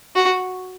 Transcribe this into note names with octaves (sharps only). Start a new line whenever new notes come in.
F#4